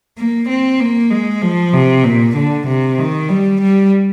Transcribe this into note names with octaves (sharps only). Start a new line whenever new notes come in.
A#3
C4
A#3
G#3
F3
C3
A#2
D3
C3
D#3
G3
G3